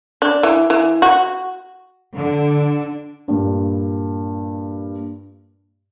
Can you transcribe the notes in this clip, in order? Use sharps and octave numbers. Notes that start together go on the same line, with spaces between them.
D4
E3
E3
F#4
D3
G2 A#2